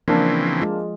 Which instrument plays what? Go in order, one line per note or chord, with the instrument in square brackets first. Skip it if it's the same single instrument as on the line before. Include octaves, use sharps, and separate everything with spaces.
[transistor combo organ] C#3 E3 C4 [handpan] F3 [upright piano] A#3 D4
[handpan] G#3 F4